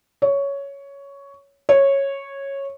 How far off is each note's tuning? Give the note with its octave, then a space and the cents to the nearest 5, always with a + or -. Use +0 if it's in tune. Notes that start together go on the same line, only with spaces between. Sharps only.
C#5 +10
C#5 -10